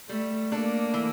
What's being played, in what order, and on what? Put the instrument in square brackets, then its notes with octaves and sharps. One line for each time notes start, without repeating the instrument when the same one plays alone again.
[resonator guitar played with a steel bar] G3 [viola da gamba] A3
[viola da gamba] A#3 [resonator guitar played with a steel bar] D4 A4
[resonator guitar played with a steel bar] E3